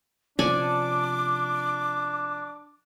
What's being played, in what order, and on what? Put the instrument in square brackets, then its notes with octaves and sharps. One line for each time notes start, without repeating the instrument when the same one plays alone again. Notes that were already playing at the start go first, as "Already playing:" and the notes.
[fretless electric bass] C3 F3 C#4 [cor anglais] D4 [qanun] A4 D5 G#5 [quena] D6